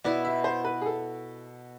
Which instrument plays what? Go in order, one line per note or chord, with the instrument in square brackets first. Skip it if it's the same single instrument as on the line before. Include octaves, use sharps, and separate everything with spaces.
[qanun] B2 B3 E4 [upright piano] D5
[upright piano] E5
C5
B4
G#4
A4